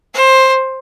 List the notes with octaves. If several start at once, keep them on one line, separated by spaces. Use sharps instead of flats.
C5